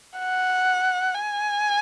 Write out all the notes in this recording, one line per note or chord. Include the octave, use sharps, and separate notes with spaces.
F#5
G#5